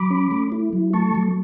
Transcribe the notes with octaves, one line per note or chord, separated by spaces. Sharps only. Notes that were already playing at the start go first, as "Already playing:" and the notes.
Already playing: F#3 B5 D6
C#4
A3
E4
F#3
A3 A5 C#6
F#3